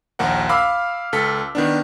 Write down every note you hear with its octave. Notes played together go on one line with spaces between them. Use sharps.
A#1 D#2 A#4 F#5
F5 B5 D6 E6 F6
C#2 A4 B6
D#3 B3 D4